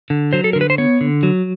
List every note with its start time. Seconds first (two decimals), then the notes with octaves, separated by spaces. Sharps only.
0.10 D3
0.33 F#3 C5
0.44 A4
0.53 D3 A#4
0.61 B4
0.70 C5
0.78 B3 C#5
1.01 D3
1.23 F#3